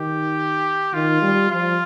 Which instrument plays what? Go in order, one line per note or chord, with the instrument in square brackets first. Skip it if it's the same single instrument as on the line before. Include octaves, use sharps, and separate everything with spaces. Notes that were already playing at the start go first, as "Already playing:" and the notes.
Already playing: [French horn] D#3 [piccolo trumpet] G4
[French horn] D#3 [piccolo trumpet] F4
[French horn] G3
[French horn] F3 [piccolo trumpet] F4